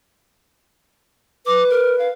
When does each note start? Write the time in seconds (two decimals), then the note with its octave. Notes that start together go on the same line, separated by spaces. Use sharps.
1.46 B4 D6
1.70 A#4
1.99 F5